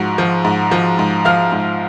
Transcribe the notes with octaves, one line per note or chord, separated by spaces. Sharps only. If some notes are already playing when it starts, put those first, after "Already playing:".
Already playing: G#2 F3 F#4 F#5
F3
G#2
F3
G#2
F3 F5 F6
G#2